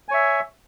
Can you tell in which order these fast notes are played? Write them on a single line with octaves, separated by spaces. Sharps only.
G#5 C#5 E5